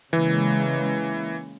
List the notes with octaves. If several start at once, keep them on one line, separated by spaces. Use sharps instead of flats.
C#3 E3 G#3 A#3